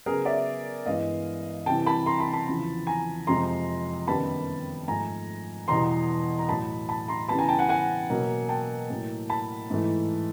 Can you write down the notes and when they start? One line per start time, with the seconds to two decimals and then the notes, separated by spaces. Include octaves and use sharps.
0.06 C#3 F#3 B3 G#4 A#4
0.25 D5 E5
0.86 G2 E3 G#3 B3 D#5 F5
1.66 C3 E3 G3 G5 A5
1.86 A5 B5
2.06 A#5 C6
2.20 A5 B5
2.33 A5 B5
2.47 E2 C#3 F3
2.87 G#5 A#5
3.27 F2 C3 F3 G#3 A#5 C6
4.07 F#2 D#3 G3 B3 A5 B5
4.87 G#2 F3 A3 G#5 A#5
5.68 E2 B2 G3 A#5 C6
6.39 A#5
6.48 A2 F#3 A3 A5 B5
6.89 A5 B5
7.08 A#5 C6
7.28 C#3 E3 G3 B3 A5 B5
7.38 G#5 A#5
7.49 G5 A5
7.59 F#5 G#5
7.69 F#5 G#5
8.10 B2 F#3 A#3
8.49 G5 A5
8.89 A2 F#3 A#3
9.30 A5 B5
9.70 G#2 E3 A3